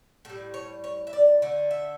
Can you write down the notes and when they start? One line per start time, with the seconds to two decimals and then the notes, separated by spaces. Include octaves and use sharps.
0.25 A2 A4
0.29 G3
0.54 C#5
0.84 C#5
1.07 E5
1.13 D5
1.42 D3 A3
1.71 E5